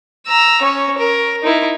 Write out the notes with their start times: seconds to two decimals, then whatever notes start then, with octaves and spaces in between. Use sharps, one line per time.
0.27 A#5 E6
0.62 C#4 C#5
0.98 A#4
1.43 D#4 E4